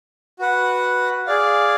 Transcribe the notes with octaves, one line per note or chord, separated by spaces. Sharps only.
F#4 B4 F#5
G#4 D5 F5